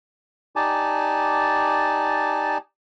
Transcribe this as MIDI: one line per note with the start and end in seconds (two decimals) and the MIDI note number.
0.56 2.58 63
0.56 2.58 67
0.56 2.58 74
0.56 2.58 80
0.56 2.58 81